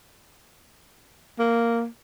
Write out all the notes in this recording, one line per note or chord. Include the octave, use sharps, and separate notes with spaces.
A#3